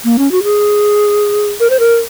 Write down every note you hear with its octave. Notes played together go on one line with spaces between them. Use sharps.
A#3
C#4
F#4
G#4
A#4
C5
A#4